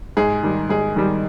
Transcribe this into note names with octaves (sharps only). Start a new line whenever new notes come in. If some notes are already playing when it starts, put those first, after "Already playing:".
G#2 G#4
D#3 G3
G#2 G#4
D#3 G3